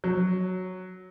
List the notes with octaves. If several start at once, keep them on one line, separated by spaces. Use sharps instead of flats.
F#3